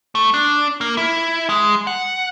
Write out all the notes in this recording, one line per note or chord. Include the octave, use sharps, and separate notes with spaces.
A3
D4
A#3
E4
G#3
F#5